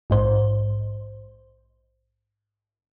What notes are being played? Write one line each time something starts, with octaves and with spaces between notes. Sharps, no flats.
A#1 G#2 C5